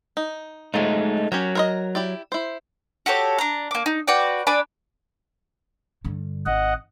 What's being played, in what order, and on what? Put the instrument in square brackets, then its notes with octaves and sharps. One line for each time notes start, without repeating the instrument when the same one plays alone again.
[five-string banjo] D#4
[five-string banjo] F3 F#3 [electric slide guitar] G#3 A3 D#4
[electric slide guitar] F#3 [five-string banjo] C#4 G4 A#4
[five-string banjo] A#4 C5 D#5
E4 G4 D5
E4 C5
[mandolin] F#4 G4 A4 C#5
D4 A#5
A#3 D6
D#4
F#4 B4 D5 G5
D4 D5 G#5 B5
[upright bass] G2 D3
[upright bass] G#1 [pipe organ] D#5 F#5